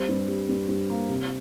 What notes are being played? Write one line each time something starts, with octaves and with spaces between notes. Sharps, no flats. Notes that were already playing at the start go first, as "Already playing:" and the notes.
Already playing: G3 C4
G2
G3
G2
G2
A#3
C3